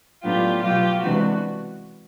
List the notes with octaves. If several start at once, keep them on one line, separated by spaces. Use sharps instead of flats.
A2 F#3 B3 D4 F4 G4
B2 F#3 B3 F4 G4
C3 E3 G#3 B3 D4 F#4